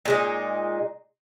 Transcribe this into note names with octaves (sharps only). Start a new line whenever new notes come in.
A#2 G#3 D#4